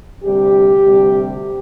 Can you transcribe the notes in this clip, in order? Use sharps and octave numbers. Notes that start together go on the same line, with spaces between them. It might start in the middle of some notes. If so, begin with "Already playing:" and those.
D2 C3 G3 G4
D2 C3 G3